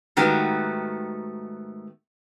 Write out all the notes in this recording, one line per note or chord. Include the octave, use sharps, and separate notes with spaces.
G#2 D#3 A3 B3 F#4 G4